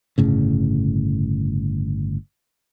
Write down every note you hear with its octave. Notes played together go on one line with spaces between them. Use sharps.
G1 A2 C#3